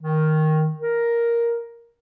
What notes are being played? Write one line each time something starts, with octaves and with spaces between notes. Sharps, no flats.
D#3
A#4